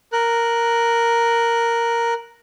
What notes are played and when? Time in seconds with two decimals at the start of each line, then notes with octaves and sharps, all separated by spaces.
0.13 A#4 F#6